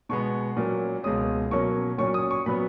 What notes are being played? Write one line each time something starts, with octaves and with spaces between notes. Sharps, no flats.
B2 G#3 B3 C#6
A#2 F#3 A#3 C#4
C#2 B2 G#3 C#4 D#6
B2 F#3 A#3 C#4 C#6
A#2 F#3 C#4 C#6
D#6
C#6
A#2 F#3 B3 B5